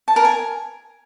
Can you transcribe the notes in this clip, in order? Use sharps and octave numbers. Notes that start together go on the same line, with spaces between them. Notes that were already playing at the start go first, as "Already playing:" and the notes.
A5
A#4
G#5